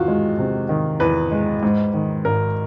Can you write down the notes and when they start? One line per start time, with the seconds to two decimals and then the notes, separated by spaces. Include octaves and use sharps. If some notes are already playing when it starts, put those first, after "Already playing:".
Already playing: E2 D#3 F4 F#4
0.08 G#3
0.39 C3
0.69 D#3
1.00 E2 B4
1.32 G#3
1.63 G#2
1.94 D#3
2.25 G#1 A#4